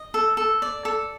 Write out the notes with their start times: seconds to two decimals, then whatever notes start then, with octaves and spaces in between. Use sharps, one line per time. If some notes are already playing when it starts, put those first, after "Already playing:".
Already playing: D#5
0.14 A4
0.37 A4
0.62 D5
0.85 A4